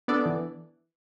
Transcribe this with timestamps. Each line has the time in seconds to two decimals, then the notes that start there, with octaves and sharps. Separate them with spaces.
0.08 B3 D4 A4 D5
0.26 E3